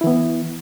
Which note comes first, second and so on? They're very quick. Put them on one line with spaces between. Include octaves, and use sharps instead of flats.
E4 E3 B3